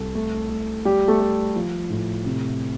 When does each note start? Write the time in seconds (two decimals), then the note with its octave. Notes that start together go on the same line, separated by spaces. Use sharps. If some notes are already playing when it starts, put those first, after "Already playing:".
Already playing: C2 A4
0.15 A3
0.50 A3
0.85 G3 A3 G4
1.08 A3 A4
1.20 A3
1.56 F3
1.90 A2
2.25 C3